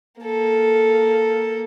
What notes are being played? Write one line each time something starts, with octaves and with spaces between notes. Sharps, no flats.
A#3 A4